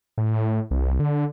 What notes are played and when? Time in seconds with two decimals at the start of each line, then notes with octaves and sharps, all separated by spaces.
0.18 A2
0.71 C2
0.99 D3